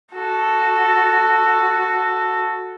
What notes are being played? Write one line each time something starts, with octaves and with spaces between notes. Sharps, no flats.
F#4 A4